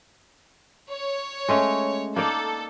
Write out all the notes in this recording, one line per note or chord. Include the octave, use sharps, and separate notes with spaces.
C#5
G#3 A3 C#4
A#3 D#4 A4 D5